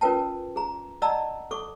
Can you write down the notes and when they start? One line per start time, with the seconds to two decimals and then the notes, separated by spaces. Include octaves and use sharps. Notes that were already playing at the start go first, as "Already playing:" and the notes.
0.01 C#4 F4 A#4 B4 G5 A5
0.56 G#4 A#5
1.02 D5 D#5 F#5 A5 A#5 E6
1.51 A4 C#6 D6